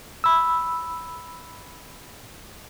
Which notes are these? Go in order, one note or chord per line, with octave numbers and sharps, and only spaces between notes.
B5 E6